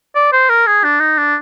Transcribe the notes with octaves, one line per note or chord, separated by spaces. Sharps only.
D5
C5
A#4
G#4
D4
D#4
D4